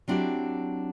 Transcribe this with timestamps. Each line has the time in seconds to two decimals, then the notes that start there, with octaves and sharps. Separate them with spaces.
0.08 F#3 C4 D4 E4 F#4 G4